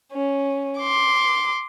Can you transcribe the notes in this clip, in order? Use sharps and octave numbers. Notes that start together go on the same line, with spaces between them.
C#4
C6 D6